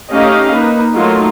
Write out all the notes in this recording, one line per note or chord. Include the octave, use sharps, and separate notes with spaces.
A3 C#4 D#4 G4 D#5 F5
A#3 D#4 B4
F#3 A3 A#3 D#4 F4